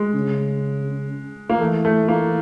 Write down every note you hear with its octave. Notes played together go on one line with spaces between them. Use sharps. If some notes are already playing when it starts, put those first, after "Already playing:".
Already playing: G#3
C#3
A#3
E3 A3
A3
A#3